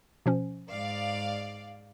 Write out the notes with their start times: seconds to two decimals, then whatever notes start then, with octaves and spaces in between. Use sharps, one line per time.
0.26 B2 F3 C#4
0.71 G#2 D5 F5